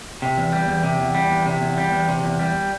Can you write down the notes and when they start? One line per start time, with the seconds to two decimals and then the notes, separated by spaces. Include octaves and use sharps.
0.22 C3
0.38 E2
0.53 G3
0.68 E2
0.84 C3
1.00 E2
1.15 G3
1.31 E2
1.46 C3
1.62 E2
1.78 G3
1.92 E2
2.09 C3
2.24 E2
2.39 G3